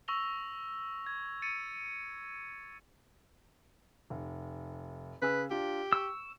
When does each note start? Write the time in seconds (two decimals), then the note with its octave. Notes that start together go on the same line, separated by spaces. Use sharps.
0.08 C#6 E6 A#6 F7 G7
1.06 G#6
1.42 A6 C#7 D#7
4.10 F1
5.22 C#3 G#4 B4 E6
5.51 D4 F4 G4
5.93 C#6 E6